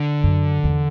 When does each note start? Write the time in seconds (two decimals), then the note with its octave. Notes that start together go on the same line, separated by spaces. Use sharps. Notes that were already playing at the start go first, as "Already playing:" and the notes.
Already playing: D3
0.23 F#2
0.64 E2